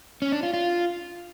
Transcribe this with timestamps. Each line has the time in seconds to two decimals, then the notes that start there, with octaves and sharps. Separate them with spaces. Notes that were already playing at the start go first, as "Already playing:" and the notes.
0.22 C#4
0.32 D4
0.43 F4
0.53 F4